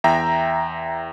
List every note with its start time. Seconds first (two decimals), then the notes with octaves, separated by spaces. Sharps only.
0.04 E2 E5 G5 A#5